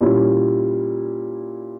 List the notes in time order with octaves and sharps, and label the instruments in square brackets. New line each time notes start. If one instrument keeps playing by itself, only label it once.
[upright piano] A#2 G3 C#4 E4